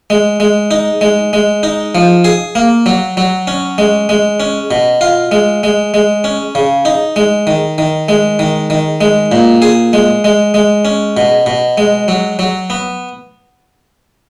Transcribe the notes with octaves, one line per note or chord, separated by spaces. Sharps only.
G#3
G#3
D#4
G#3
G#3
D#4
F3
G#4
A#3
F#3
F#3
C#4
G#3
G#3
C#4
B2
F4
G#3
G#3
G#3
C#4
C#3
D#4
G#3
D#3
D#3
G#3
D#3
D#3
G#3
A#2
G#4
G#3
G#3
G#3
C#4
B2
B2
G#3
F#3
F#3
B3